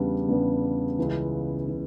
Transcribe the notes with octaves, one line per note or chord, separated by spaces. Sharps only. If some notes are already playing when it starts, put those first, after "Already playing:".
Already playing: E2 C#3 G3 B3 D4
E2 C#3 G3 B3 D4
C#2 C#3 E3
C#3 E3